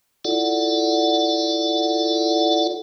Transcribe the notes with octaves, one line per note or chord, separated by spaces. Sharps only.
E4 F4 A4 D5 F#5